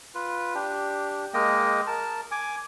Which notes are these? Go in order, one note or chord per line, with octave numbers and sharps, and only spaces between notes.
F4 B4
D4 G4
G#3 A#3 D#5 G5
A#4 A5
G#5 D6